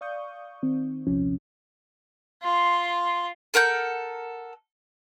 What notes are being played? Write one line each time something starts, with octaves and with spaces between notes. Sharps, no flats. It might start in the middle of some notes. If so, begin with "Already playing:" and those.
D5 F5 C#6 D#6 G6
D#3 C4
A#1 D#2 C3 F3 C#4
F4 C6
A4 A#4 F#5 G6